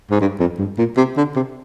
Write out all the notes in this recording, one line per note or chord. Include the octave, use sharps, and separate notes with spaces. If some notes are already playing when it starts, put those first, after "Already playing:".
G#2
G2
F2
G2
A#2
C3
D3
C3